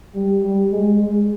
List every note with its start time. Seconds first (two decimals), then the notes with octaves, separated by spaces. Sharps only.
0.15 G3
0.43 G3
0.72 G#3
1.01 G#3